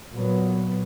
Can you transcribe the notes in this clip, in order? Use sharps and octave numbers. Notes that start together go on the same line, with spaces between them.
A#2 F#3 B3